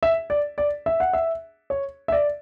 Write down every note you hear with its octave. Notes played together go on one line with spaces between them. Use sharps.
E5
D5
D5
E5
F#5
E5
C#5
E5
D5